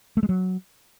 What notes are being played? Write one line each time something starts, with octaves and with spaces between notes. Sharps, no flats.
A3
G#3
F#3